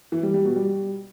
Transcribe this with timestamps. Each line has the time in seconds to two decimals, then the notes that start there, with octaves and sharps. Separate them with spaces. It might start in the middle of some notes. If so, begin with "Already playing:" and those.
0.12 E3
0.23 G3
0.34 G3
0.45 B2
0.56 G3